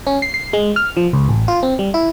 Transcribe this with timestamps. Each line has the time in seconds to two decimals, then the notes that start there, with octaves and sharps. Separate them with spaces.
0.07 C#4
0.22 C7
0.34 C7
0.53 G#3
0.76 F6
0.97 F3
1.13 C#2
1.29 A1
1.48 F4
1.63 C4
1.79 G3
1.94 E4